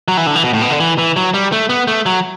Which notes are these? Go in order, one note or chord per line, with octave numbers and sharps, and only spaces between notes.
F#3
E3
D3
E3
B2
A2
B2
D3
E3
E3
F#3
G3
A3
B3
A3
F#3